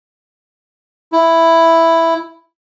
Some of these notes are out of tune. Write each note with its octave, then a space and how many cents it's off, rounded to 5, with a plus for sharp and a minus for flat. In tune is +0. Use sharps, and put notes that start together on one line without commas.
E4 +0